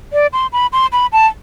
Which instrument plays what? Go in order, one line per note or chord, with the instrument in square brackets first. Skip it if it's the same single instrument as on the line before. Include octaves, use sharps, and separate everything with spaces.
[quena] D5
C6
B5
C6
B5
A5